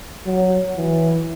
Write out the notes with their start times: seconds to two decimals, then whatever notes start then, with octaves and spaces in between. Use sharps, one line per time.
0.26 F#3
0.77 E3